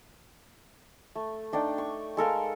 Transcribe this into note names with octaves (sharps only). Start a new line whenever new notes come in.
A3
A3 D4 D#4 G5
C#6
G#3 A4 A#4 F5